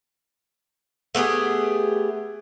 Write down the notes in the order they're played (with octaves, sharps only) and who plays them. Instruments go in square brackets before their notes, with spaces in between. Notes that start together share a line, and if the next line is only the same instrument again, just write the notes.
[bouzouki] A3 B3 G4 G#4